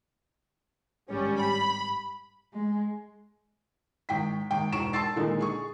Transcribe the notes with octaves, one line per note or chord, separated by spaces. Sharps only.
G#1 G3 C#4
B5
G#3
G#1 G5 B6
G#1 G5
E1 G#2 C#6 D7 E7
A5 C6 E6 A6 C7
A#2 D3 D#3 G#3 D#4
G#4 C#6